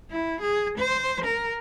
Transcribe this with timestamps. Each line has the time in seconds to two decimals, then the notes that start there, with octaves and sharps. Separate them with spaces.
0.11 E4
0.41 G#4
0.78 C5
1.25 A#4